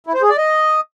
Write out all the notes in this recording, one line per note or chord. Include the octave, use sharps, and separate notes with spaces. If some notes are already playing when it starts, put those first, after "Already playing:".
E4
C5
G#4
D5
D#5